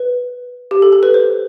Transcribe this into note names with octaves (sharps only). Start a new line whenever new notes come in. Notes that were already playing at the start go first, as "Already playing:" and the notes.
Already playing: B4
G4
A4
A4
B4
C5